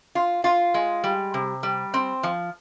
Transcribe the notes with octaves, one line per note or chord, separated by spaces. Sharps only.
F4
F4
G#3
G3
C3
G3
C4
F3